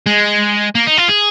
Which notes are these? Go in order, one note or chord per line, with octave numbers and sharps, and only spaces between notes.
G#3
A#3
D#4
F4
G#4